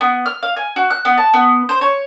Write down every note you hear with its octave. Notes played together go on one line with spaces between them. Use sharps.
B3
F6
F5
G#5
F#4
F#6
B3
A5
B3
C5
C#5